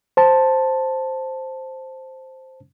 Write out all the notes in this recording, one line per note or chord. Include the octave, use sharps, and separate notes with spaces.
C5 A5